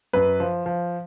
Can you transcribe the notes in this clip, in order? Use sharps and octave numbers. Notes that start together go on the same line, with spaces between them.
F#2 B4
F3
F3